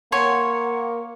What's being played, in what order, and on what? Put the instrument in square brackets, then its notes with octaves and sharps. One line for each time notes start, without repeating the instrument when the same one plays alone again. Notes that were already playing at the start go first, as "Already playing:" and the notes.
[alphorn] A#3 [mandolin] C#5 G#5 [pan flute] F#5 [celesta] C6 C#6